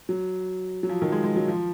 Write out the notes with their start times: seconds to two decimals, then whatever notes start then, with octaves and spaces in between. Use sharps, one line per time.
0.09 F#3
0.83 F#3
0.89 F3
1.02 D#3
1.12 G#3
1.24 G#3
1.36 F#3
1.48 F3